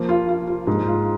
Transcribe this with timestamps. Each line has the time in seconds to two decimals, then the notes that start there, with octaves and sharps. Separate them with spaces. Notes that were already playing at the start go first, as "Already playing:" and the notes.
Already playing: F3 A#3
0.09 F4
0.29 F4
0.47 F4
0.67 G#2
0.87 F4